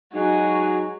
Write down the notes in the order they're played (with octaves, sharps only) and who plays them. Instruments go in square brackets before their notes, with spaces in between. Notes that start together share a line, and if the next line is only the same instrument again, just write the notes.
[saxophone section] F#3 G#3 D#4 [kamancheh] F#4 G#5